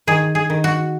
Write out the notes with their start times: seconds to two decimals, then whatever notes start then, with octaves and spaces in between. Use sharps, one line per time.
0.07 D#3 G#4
0.35 G#4
0.50 D#3
0.64 F#4